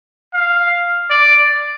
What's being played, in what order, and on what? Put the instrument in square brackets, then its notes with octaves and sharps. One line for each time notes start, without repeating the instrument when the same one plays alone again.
[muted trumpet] F5
D5